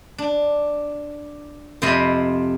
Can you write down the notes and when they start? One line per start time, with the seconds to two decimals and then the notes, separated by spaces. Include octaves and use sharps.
0.18 D4
1.82 F2 C3 C5 D#5 B5